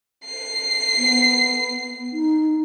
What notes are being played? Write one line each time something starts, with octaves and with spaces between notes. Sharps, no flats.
C7
B3
D#4